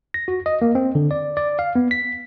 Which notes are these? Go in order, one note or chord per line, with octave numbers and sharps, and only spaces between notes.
A#6
F#4
D#5
A#3
C4
D3
D5
D5
F5
B3
B6